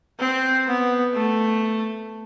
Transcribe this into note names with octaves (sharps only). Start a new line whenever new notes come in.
C4
B3
A3